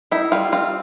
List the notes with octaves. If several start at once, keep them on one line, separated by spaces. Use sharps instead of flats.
D#4 E4
G3 F4
C4 F4